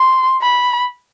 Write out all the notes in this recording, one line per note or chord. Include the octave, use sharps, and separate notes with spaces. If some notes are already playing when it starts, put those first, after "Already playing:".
Already playing: C6
B5